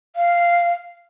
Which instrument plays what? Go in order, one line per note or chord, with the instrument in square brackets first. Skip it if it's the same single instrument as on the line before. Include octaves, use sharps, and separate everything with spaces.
[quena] F5